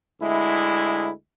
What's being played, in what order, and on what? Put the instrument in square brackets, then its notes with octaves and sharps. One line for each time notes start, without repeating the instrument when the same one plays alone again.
[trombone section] D2 G#3 E4